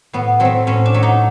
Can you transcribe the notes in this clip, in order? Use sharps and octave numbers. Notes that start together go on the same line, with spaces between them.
A2 B3
F#3 A3 C4
A2 C#4
D4
F#3 A3
D#4